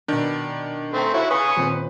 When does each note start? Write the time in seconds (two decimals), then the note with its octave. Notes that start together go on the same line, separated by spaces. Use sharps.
0.08 B2 D#3 D4 D#4
0.94 A3 C4 A4 G#5 A#5
1.14 E4 F#4 C#5
1.31 B4 G#5 C#6 D#6
1.56 D#1 C4